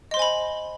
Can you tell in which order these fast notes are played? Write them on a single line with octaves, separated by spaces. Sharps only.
D#5 C6 C5 G#5 B5